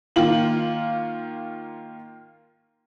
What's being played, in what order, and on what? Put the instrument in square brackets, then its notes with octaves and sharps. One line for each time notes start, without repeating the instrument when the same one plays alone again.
[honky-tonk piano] D#3 A#3 F4 F#7